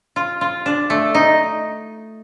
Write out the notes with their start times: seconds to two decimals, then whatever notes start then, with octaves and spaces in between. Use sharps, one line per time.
0.16 F4
0.41 F4
0.66 D4
0.90 A3
1.14 D#4